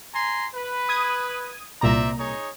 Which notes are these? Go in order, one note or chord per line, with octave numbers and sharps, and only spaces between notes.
G#5 A#5 C6
B4
D#6 G#6 D#7
C2 A#2 C5 D5 E5 A#5
D#4 G#4 C#5